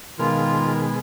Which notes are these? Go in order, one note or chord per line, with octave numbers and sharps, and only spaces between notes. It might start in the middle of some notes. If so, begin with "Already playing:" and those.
B2 D#3 G#3 F4 A#4